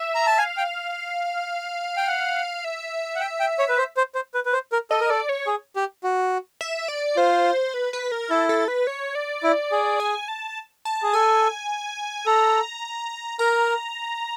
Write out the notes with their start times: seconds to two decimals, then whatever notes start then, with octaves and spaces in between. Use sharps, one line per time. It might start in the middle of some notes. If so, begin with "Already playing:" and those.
Already playing: E5
0.15 A#5
0.27 A5
0.38 F5 G#5
0.57 G5
1.97 G5
2.08 F#5
2.65 E5
3.16 F#5
3.21 G5
3.40 G5
3.59 C#5
3.69 B4
3.78 C5
3.97 C5
4.15 C5
4.34 B4
4.46 B4
4.53 C5
4.72 A#4
4.91 A4 D#5
5.00 A#4
5.09 A4 D5
5.29 C#5
5.47 G#4
5.76 G4
6.04 F#4
6.61 E5
6.88 D5
7.17 F4 C5
7.74 B4
7.93 B4
8.12 A#4
8.30 E4 A4
8.49 A4
8.68 B4
8.87 C#5
9.15 D5
9.43 E4
9.72 G#4
10.00 G#5
10.28 A5
10.85 A5
11.03 G#4
11.13 A4 G#5
12.26 A4 A#5
13.39 A#4 A#5